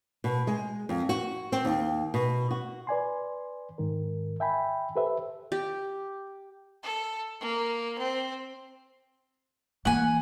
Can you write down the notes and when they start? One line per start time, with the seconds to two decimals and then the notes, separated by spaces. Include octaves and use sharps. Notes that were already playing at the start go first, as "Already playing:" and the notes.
0.24 B2
0.47 G#3
0.89 F2
1.09 F#4
1.52 C4
1.65 D#2
2.14 B2
2.51 F#4
2.87 B4 D5 G#5 C6
3.78 G#2 D#3 A#4
4.40 E5 G5 G#5 B5
4.96 G4 A4 B4 C5 E5
5.52 G4
6.83 A4
7.41 A#3
7.99 C4
9.85 E3 A#3 F#5 G#5